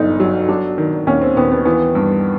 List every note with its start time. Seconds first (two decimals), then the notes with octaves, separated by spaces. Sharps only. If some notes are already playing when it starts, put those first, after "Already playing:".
Already playing: G1 F#2 D#4
0.20 F#3
0.49 F#3 D4
0.78 D#3
1.07 D#2 C#4
1.22 C4
1.36 D#2 B3
1.51 B3
1.65 E3 B3
1.95 G2